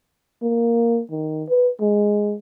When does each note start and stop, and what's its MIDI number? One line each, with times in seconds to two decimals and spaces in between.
0.42 1.01 58
1.11 1.44 51
1.49 1.70 71
1.80 2.35 56